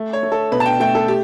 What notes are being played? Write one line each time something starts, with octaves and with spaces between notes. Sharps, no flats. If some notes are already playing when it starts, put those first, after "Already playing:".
Already playing: A3
C#5
A3
A4
B2 B4
A5
G5
A3 G5
A4
G4